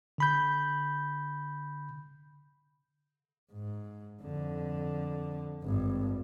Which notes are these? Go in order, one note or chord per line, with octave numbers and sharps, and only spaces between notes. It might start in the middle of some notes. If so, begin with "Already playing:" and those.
D3 B5 G6
G#2
F2 D3
G#1 G2